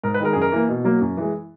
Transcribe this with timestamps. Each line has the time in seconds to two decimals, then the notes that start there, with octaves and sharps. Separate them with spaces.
0.03 G#2 A#4
0.14 B4
0.20 D#3 G#3 A#4
0.33 F#2 G#4
0.42 A#4
0.52 E3 A#3
0.68 B2
0.84 F#3 A#3
1.01 F#2
1.17 E3 G#3